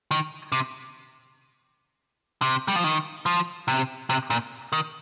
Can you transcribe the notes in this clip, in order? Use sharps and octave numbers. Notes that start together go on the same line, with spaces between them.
D#3
C3
C3
G3
F3
D#3
F3
C3
C3
A#2
D#3